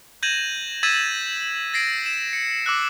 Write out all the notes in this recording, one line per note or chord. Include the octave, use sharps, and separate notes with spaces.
G6 G#6 A#6 D#7 E7 F#7
E6 G#6 A6 B6 D#7 E7
A6 A#6 C7 D7
E7
C#7
D6 E6 F#6